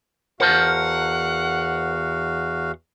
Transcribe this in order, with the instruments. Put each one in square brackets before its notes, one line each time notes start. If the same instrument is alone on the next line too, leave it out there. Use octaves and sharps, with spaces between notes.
[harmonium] E2 F#4 F5 [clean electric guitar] A#4 C5 A5 [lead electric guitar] F#5